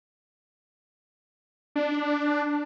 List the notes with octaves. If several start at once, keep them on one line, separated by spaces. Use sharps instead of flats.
D4